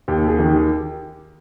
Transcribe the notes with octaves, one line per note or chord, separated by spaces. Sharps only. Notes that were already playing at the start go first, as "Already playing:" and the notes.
D#2 G4
G#4
D#3
G4